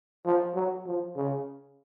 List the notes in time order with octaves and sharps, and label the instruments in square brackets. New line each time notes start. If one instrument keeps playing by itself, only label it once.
[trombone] F3
F#3
F3
C#3